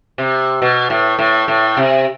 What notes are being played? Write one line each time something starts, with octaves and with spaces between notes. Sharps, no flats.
C3
B2
A2
A2
A2
C3